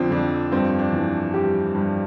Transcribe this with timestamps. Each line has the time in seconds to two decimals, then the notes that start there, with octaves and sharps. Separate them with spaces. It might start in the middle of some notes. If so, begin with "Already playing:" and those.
Already playing: F2 D3 F3 C4 D4
0.11 F2 D4
0.52 G2 C4
0.79 D4
0.93 E3
1.34 G3 G4
1.75 G2